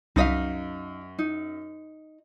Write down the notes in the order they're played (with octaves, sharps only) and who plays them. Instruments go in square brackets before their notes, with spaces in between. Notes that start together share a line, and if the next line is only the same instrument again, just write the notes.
[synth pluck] C2 A#6 B6 [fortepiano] F#2 [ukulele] D#4 D#5 F5
[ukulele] D#4